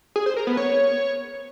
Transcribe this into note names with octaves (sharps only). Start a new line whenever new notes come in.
G#4
C5
A#4
B3
C#5